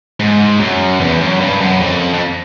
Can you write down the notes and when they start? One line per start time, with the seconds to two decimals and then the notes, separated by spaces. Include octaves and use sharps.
0.20 G#2
0.60 F#2
1.00 E2
1.21 F#2
1.40 G2
1.61 F#2
1.81 F2
2.14 F2